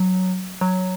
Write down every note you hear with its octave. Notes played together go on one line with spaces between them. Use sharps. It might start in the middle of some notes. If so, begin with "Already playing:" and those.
Already playing: F#3
F#3